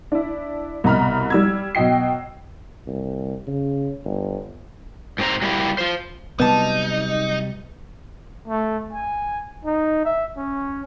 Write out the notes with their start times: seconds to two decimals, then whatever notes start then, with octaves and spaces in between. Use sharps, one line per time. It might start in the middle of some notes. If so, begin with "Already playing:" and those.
0.12 D4 E4
0.84 C2 B2 D#5 A#5 B5 F6
1.30 G3 E6 G#6
1.75 B2 F#3 D#5 G5 C7
2.87 C2
3.47 C#3
4.05 G1
5.19 G#2 C4 G4 C5 A#5
5.42 F#3 G3 A#3 D#4 E4 G4
5.78 F4 C5
6.40 C3 E3 F#3 G3 B3 D#4 A5
8.48 A3
8.93 G#5
9.65 D#4
10.05 E5
10.37 C#4